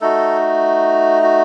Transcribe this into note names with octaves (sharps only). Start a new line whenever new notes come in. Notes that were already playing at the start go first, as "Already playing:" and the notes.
A3 D#4 F#4 A4
F#4